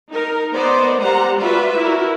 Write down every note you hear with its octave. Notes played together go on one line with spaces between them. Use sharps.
D#4 A#4
B3 A#4 C5 D5 D#5
G3 C5 F#5 A#5
F4 F#4 B4 D5 E5
E4 F#4 A#4